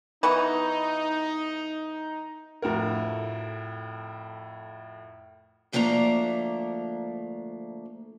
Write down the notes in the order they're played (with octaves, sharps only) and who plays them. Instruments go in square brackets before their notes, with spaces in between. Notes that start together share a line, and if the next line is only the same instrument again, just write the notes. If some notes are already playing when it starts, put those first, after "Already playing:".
[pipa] E3 B3 F#4 [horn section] D#4
[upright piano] F2 A2 F#4 A#4
[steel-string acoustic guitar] D2 F3 A3 A#3 D4 A#5